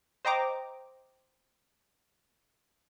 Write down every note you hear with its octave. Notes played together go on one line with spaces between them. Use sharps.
C5 D#5 G5 A#5 D6